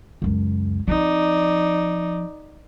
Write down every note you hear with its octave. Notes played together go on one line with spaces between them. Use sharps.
C#2 F#2
F3 C4 D#4 D5